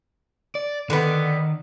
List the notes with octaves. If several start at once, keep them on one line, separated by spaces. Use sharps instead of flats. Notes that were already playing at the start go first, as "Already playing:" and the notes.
D5
D3 D#3 B3